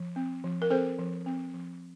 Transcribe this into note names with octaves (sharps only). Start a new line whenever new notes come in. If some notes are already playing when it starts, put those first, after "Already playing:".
Already playing: F3
C4
F3
A#4
C4 A4 C5
F3
C4
F3